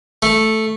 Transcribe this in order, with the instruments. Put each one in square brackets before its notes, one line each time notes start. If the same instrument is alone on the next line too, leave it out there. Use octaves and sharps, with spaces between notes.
[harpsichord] A3